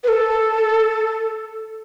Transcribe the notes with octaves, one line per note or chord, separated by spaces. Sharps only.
B4
A4